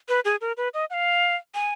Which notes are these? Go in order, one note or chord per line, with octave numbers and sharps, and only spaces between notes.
B4
G#4
A#4
B4
D#5
F#5
F5
G#5